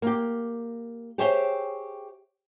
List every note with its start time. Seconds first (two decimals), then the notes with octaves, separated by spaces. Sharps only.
0.02 A#3 G4
1.18 G4 G#4 C5 C#5 E5 G5